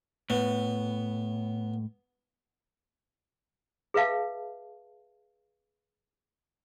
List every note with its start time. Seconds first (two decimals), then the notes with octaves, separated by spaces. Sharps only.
0.30 A2 B3
3.94 G#4 B4 E5 F5 A5